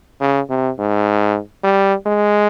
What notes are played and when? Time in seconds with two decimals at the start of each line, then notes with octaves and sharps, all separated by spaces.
0.20 C#3
0.50 C3
0.79 G#2
1.64 G3
2.07 G#3